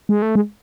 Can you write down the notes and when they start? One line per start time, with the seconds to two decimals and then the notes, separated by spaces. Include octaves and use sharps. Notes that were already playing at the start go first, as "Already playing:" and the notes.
0.09 G#3
0.22 A3
0.35 G#3